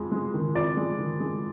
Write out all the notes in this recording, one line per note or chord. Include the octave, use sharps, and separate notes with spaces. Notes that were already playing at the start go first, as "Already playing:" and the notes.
Already playing: F2 G#3
G#3
D#3
F2 D5
G#3
D#3
G#3